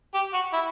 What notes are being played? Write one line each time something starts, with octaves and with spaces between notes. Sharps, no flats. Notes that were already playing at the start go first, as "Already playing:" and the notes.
G4
F#4
E4